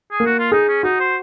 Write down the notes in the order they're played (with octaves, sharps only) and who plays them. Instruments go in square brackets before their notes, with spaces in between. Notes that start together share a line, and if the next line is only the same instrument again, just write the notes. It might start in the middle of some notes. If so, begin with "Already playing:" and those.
[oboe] G#4
[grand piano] A#3
[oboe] F#4
F4
[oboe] D#4 [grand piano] G#4
[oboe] C#4
[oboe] D#4 [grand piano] F#4
[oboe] C5